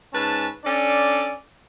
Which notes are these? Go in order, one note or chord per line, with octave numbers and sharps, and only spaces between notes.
G#2 C#4 B4 A5
C#4 D4 A4 D5